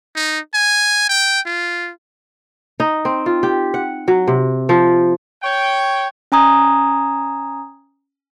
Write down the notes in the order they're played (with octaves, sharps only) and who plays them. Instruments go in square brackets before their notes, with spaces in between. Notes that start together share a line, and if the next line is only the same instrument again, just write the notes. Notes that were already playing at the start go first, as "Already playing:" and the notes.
[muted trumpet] D#4
G#5
G5
F4
[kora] D#4
C4
F4
G4
F#5
F#3
C3
F3
[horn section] C#5 G5
[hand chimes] C#4 G#5 A#5 D#6 G#6